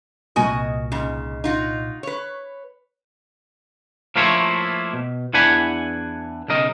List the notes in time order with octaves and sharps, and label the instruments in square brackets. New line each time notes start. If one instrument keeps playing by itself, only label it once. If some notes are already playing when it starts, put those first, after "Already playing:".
[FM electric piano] C2 A#2 D#5 [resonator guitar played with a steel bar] F#4 A#4 G#5
[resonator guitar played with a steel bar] G#2 C#3
D#4 F4 F#4
B4 C#5
[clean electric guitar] F3 A3 A#3 E4 F4 C#5
B2
E2 E3 D4 F#5 G#5 B5
B1 C#3 A#4 D#5